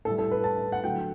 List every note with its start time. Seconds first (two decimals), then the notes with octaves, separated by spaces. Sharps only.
0.05 A2 G3 A4
0.19 A4
0.31 B4
0.44 A5
0.72 F#5
0.83 D3 F#3 A3 G5